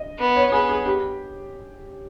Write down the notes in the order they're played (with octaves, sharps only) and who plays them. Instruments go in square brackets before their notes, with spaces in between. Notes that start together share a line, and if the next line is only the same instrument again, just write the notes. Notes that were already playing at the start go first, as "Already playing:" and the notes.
Already playing: [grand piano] D#5
[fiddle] B3
[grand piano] C#5
[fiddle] B3 [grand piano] G#4
[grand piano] G#4
G4